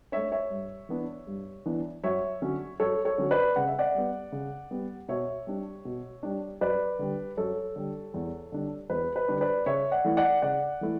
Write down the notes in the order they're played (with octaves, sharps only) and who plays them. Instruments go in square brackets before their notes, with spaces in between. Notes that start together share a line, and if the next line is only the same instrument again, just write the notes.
[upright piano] A3 D4 C#5 E5
C#5 E5
G2
E3 B3 D4
G2
E3 B3 D4
F#2 C#5 E5
D3 F#3 C#4
F#2 A4 C#5
A4 C#5
D3 F#3 C#4
B4 D5
C#3 F#5
E5
D5 F#5
G3 B3
C#3
G3 B3
B2 C#5 E5
G3 D4
B2
G3 D4
F#2 B4 D5
D3 G3
F#2 A4 C#5
D3 G3
E2
D3 G3 D4
E2 B4
B4
D3 G3 D4
B4 D5
C#3 C#5 E5
D5 F#5
E3 A3 E4
D5 F#5
C#3 D5 F#5
E3 A3 E4